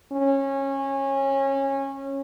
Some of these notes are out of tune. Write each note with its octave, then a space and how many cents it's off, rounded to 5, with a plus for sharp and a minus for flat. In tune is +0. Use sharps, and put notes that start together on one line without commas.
C#4 -20